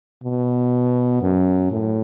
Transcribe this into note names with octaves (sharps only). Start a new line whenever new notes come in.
B2
F#2
A2